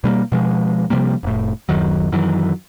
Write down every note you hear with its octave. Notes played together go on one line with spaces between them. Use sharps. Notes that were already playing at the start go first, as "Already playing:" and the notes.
B2 G3 A3 A#3
B2 F3 G#3
C3 F3 G3 A#3
F1 A2
D1 F#2 D#3 F#3
F#2 D#3 E3 F#3